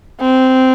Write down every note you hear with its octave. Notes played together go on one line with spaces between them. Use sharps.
C4